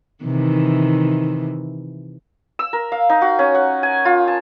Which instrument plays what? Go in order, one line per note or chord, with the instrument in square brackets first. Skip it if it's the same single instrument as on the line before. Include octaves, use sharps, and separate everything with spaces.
[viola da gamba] C3 D#3 E3
[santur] E6
A#4
F5
D#4
F#4
C#4
F#5
G#5
F4
A5